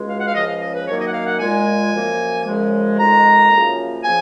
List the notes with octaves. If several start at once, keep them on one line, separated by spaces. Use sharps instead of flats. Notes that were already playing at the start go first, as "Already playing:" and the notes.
Already playing: C#2 B2 G#3
F5
F#5
F5
C#2 C#3 F3 D#5
F5
D#5
B4
F#2 D#3 F#3 A#3 C#5
D#5
F#5
F5
F#5
A#2 G#3 G#5
F#2 F3 A#3
F#2 C#3 F3 G#3
F2 D#3 G#3 A#5
F#2 C#3 F3 A#3
C#3 F3 G#5